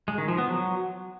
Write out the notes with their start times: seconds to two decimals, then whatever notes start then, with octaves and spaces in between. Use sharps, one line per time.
0.08 G#3
0.18 D#3
0.28 F3
0.38 B3
0.48 F#3